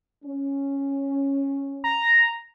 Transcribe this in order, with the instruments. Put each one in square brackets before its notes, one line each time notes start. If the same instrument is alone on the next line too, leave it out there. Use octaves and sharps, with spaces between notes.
[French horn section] C#4
[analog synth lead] A#5